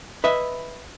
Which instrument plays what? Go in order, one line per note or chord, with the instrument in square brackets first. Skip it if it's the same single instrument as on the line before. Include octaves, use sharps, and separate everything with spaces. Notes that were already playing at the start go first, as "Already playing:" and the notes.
[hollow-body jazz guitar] B4 D#5 E5